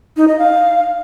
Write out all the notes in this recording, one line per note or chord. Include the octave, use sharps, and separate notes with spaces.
D#4
D#5
F5